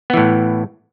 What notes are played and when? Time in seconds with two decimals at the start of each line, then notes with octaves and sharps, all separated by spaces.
0.10 B3
0.14 E3
0.17 A2